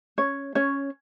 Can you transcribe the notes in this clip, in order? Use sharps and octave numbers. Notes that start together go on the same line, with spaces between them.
C#4 C#5
C#4 C#5